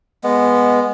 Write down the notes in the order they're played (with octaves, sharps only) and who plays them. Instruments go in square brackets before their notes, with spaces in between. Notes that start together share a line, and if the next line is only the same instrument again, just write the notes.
[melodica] G#3 B3